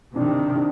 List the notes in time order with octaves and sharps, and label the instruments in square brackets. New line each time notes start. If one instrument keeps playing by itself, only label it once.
[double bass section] C3 D#3 [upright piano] D4
[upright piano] D4